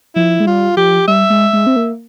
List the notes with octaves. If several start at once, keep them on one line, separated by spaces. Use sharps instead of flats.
F3 E4
G#3
G3 F4
F3 G4
G3 E5
G#3
G#3
C4
A#3